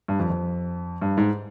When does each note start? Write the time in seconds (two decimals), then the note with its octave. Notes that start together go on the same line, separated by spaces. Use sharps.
0.08 G2
0.19 F2
0.30 F2
1.02 G2
1.17 G#2